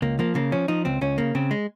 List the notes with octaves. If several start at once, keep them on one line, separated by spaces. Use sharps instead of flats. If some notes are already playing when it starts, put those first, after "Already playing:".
C#2 A#3
F3 A#3
C#3 A#3
F3 C#4
F3 D#4
C#2 C4
C#2 C#4
C#3 A#3
C#3 C4
G#3